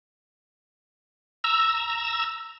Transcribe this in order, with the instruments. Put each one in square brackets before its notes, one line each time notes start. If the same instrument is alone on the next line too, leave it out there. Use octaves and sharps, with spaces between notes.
[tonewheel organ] A#5 E6